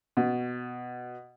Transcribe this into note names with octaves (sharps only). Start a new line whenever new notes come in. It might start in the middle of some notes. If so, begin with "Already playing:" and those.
B2